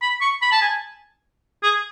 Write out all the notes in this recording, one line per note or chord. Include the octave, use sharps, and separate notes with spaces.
B5
C#6
B5
A5
G#5
G#4